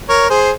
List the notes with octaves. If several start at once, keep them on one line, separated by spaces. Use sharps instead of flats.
A#4 C#5
G#4 C5